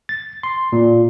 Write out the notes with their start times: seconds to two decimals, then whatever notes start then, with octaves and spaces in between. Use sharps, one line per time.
0.09 A6
0.43 C6
0.72 A#2